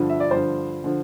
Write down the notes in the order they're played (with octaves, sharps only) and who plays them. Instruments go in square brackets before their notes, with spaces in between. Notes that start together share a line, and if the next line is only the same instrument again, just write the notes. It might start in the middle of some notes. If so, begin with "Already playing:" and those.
Already playing: [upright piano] G2 D3 F3
E5
D5
G2 D3 F3 C5
D3 F3